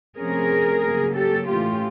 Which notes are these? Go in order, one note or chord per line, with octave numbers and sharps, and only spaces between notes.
C3 F3 A3 C#4 G#4 A#4
C#3 F#3 A#3 C#4
G4 A4
A2 E3 A3 C#4 F4 G4